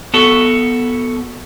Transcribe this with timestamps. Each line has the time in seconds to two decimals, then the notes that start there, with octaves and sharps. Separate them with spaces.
0.14 B3 F#4 A4